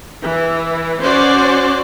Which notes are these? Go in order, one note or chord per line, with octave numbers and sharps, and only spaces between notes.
E3
C#4 F#4 C5 D5